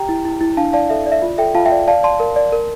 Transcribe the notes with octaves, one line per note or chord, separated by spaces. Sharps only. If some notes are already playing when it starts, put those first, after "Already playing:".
Already playing: G4 G5 A#5
E4
E4
E4
D4 F5 A5
D5 F5 A5
A4 E5
D5
E5
F4
A4 E5 G5
F4 F5 A5
E5 G5
D5
D5 F5 A5
D5 A5 C6
A#4
D5
A#4